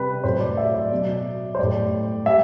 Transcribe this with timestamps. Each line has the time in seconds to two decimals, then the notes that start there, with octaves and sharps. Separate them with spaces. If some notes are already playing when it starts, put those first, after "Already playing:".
Already playing: C3 G3 B4
0.24 A2 F#3 C5
0.41 D5
0.57 E5
0.74 D5
0.92 B2 F#3
1.55 C5
1.59 A2 G3 D5
2.26 G3 E5